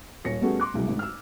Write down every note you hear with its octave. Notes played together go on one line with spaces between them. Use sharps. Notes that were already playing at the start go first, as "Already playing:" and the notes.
D#1 C#5 A#6 C#7
G3 A3 B3 C#4 F#4 G#4
C6 D6 F#6
C2 F#3 G#3
G#1 D2
E6 F6